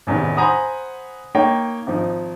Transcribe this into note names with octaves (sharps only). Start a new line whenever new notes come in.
A1 E2 C3 D#3
C5 F#5 G#5 A#5 B5 D#6
A#3 D#4 C#5 G5
G#1 F3 D#4